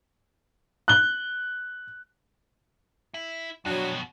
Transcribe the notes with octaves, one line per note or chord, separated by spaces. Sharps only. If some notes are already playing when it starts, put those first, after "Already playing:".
F#6 G7
E4
F2 B2 F#3 D4